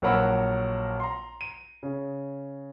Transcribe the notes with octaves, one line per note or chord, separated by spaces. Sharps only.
A#1 F#3 A#4 F#5 B5 E6
A#5 C6
D#7
C#3